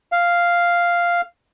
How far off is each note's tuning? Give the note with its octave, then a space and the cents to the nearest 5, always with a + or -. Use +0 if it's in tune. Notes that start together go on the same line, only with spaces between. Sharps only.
F5 -5